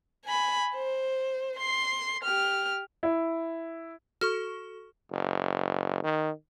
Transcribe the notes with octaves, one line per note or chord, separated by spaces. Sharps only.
G#5 B5
C5
C6 C7
G4 F6
E4
F#4 A4 C#6 F6
F#1
D#3